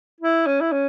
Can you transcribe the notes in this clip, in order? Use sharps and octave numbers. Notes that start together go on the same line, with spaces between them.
E4
C#4
E4
C#4